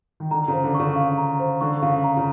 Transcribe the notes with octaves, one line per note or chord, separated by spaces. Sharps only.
D#3
D3 A#5
C#3
C5
D3
C#6
C#3
F5
A#5
C5
D3 C#6
C#3 F5
A#5
C#3